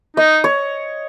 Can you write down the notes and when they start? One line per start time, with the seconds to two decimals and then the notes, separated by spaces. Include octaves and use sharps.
0.17 D#4 D#5
0.44 C#5